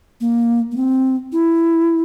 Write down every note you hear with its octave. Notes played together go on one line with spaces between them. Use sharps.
A#3
A#3
C4
E4